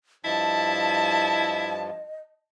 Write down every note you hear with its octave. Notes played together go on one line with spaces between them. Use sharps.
G2 F3 E4 D#5 A5